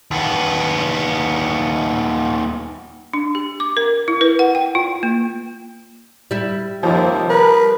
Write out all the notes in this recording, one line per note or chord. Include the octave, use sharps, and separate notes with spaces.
D#2 B3
D4
G4
D6
A#4
E4
B4
F#5
G5
F4
A#3
G3 E4
D#2 C3 F3
A#4 B4